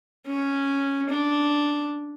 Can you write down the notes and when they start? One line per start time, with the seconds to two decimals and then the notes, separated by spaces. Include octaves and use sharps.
0.27 C#4
1.09 D4